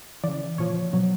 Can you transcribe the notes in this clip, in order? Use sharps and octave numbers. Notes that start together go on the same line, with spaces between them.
C#3 E3 D5
A#2 F3 C#5
B2 F#3